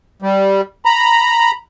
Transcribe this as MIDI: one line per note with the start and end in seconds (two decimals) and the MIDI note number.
0.22 0.61 55
0.85 1.51 82
0.85 1.51 83